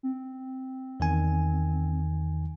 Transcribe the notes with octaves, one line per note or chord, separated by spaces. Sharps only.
C4
E2 D#3 G#5